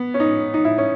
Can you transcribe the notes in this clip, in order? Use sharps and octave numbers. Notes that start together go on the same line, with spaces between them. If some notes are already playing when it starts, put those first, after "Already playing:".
Already playing: B3
C#4
D#4
D#4
E4
C#4